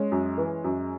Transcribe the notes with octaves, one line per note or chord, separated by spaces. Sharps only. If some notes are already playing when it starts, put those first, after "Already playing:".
Already playing: G#3 C#4
F#2
E3
F#2